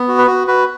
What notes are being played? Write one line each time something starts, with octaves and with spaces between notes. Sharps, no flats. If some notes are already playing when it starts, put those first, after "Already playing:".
Already playing: B3
F#4
B4
F#4
F#4 B4